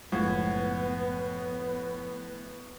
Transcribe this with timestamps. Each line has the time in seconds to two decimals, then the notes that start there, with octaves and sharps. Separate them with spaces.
0.12 F#1 A2 F3 G#3 B3 F#5 G#6